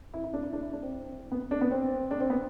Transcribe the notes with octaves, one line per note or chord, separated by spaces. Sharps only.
E4
E4
D4
E4
D4
E4
D4
C4
B3
D4
B3
C4
D4
C4
B3